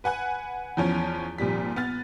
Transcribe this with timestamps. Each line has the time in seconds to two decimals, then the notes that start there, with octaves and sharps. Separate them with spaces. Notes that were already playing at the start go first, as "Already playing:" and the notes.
0.04 B4 F#5 G#5 F#6
0.77 E2 F3 C#4
1.38 G#1 A#2 F3 G3 B6
1.76 B3 F6 A6